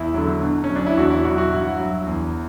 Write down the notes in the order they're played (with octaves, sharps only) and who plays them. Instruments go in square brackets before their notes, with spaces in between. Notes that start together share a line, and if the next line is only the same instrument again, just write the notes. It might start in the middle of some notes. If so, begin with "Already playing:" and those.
Already playing: [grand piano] E2 E4
D3 F#3
B2
C#4
F#3
D4
E4
E2 F#4
E4
B2 F#3 F#4
F#4
G2 E4
F#3
E2